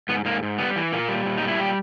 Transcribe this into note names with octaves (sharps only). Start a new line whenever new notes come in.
G#2 B3
G#2 A#3
G#2
G3 B3
E3
A#2 A#3
G3
A#2
G3 D#4
E4
A#2 G4